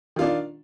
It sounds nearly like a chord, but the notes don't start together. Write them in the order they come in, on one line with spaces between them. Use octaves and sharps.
D#3 F4 D4